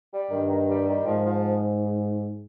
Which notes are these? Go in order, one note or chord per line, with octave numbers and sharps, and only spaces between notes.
G3
G2 D#3
D#3
G3
D#3
G#2 F3
F3